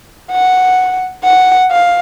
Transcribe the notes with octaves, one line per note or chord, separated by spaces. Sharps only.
F#5
F#5
F5